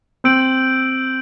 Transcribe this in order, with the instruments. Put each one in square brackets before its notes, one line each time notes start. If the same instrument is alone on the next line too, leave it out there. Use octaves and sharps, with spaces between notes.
[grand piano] C4 [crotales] E6 G6 D7 F#7